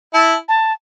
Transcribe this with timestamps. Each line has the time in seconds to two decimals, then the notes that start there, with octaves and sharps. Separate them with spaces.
0.13 E4 A5
0.48 A5